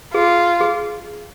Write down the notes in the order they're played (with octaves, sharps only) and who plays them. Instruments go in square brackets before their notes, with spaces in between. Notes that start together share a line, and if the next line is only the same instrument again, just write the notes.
[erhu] F4 [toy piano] G#4
[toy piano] G#4